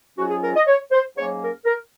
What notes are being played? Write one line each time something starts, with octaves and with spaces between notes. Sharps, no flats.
G#2 F#3 C#4 F4 F#4
G#4
A#4
D#5
C#5
C5
G#2 F#3 A#3 C#4 C#5
A#4
A#4